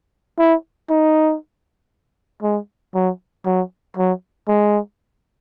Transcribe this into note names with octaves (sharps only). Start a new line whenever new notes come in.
E4
D#4
G#3
F#3
F#3
F#3
G#3